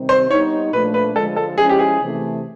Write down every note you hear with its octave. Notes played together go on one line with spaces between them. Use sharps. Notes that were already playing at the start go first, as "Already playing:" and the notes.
Already playing: C3 D#3 G3 C4
C5
G3 B3 D#4 C#5
A#2 F3 A3 D4 B4
B4
D3 F3 G#3 A4
A4
F3 G#3 C#4 E4 G#4
G4
G#4
C3 E3 A3